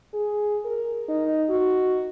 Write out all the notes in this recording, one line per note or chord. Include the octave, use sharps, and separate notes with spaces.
G#4
A#4
D#4
F#4